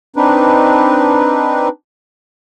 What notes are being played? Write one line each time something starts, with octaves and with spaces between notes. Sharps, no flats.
C4 D4 D#4 B4